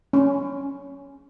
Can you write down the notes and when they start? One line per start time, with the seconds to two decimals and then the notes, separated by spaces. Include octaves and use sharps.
0.13 C#4